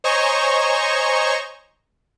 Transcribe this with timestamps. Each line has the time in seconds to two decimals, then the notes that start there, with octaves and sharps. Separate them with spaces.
0.04 C5 C#5 D#5 G#5 A#5 C#6